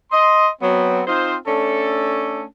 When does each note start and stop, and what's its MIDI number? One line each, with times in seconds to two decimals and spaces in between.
0.11 0.48 75
0.11 0.48 84
0.62 1.01 54
0.62 1.01 59
0.62 1.01 60
1.07 1.35 60
1.07 1.35 63
1.07 1.35 65
1.07 1.35 72
1.47 2.43 57
1.47 2.43 61
1.47 2.43 62
1.47 2.43 69